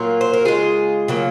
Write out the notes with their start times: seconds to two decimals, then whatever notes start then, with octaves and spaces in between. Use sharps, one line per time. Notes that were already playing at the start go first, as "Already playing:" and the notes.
Already playing: A#2 F#3 A#3 F4
0.21 C5
0.33 A#4
0.45 C#3 G#3 F4 G#4
1.08 C#3 F#3 A#3